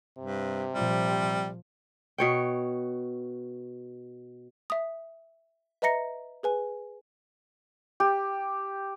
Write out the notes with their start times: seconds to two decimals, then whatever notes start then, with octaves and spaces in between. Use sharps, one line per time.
0.18 G2 C3
0.74 A#2 F3 G3
2.18 B2 C#5 G5
4.70 E5 D#6
5.82 B4 D#5 E5 A#5 A#6 C#7
6.43 G#4 B4 G#5
8.00 G4